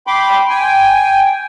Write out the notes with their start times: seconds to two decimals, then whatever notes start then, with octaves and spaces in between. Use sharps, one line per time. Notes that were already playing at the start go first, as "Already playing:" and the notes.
0.07 G5 B5 C6 D6
0.49 G5 G#5